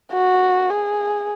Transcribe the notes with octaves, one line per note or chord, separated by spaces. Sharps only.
F#4
G#4